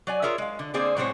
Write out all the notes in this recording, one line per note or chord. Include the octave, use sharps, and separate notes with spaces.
F#3 D5 G#5
F4 G#4 A#4 C#5 E5
G#3 F5
D3
D3 A#3 C4 G#4 C5 D5
A2 F#3 G#3 C4 C5 C#5